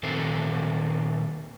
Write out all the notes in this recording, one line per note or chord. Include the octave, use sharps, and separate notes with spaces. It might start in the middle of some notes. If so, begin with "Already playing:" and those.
A#2 D#3 C4 A4 A#4 C5